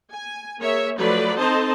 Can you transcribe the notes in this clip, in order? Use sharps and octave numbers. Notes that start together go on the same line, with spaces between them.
G#5
A#3 G#4 C#5 E5
F3 F#3 A3 A4 B4 D5
C4 D#4 A4 C5 D#5 A5